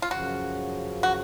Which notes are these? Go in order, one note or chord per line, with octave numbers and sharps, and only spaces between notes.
F4
F#2 C#3 F3 F#4
F#4